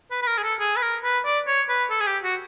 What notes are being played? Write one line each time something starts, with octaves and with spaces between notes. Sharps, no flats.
B4
B4
A#4
G#4
A4
G#4
B4
A#4
B4
D5
C#5
B4
A4
G#4
G4
F#4